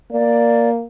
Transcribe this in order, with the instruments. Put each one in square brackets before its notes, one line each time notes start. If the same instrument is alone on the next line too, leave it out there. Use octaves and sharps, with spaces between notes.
[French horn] A#3 [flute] D5